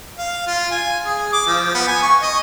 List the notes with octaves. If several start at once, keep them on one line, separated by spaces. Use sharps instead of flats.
F5
F4
G#5
G#4
D6
F3
B3
G#5
C#6
D#5